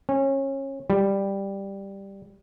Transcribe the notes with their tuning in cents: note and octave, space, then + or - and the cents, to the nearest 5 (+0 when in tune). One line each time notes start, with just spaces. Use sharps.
C#4 -25
G3 +5